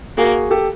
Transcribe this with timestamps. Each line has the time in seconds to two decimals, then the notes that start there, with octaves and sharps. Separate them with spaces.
0.17 A#3 F#4 G#4
0.51 G4 A4